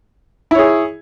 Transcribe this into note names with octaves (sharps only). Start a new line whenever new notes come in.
E4 G#4 C#5